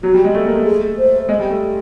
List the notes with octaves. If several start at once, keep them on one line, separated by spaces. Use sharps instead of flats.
F#3 F#4
G3
G#3
A3
A#3
A3
G#4
C5
G#3
G3
A3